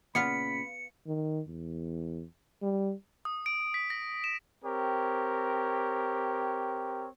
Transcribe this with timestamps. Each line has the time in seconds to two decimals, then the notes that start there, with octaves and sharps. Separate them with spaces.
0.15 A#2 C#3 B3 F4 F5 B5 C#7
1.07 D#3
1.47 E2
2.62 G3
3.25 D#6
3.46 D7
3.74 B6
3.90 A#6
4.24 E7
4.63 C4 G4 A#4 C#5